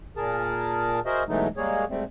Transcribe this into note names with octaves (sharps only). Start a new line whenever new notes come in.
A#2 G#4 A#4 A5
F#4 G#4 A#4 C5 D#5 E5
B2 E3 F#3 G#3 A3 D#4
G3 G#3 A#3 G#4 C#5
G#2 G3 A3 C4